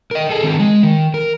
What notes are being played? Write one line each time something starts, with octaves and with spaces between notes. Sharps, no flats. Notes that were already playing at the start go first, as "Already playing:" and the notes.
A#4 D#5
G#4 A4
D#3 C4
G#3
D#3
A#4